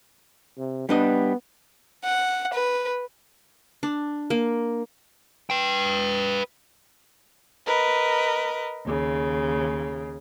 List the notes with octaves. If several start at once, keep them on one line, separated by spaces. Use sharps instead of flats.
C3
G3 B3 D4 D#5
F#5
B4
D4
A#3
B4 G5
A#4 B4 D#5
D#2 C#3